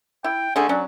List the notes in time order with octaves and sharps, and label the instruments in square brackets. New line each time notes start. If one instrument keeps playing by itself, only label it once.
[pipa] E4 [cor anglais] G5
[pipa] D3 A3 G#5 [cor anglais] G#4
[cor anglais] F#3 [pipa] C#4 D4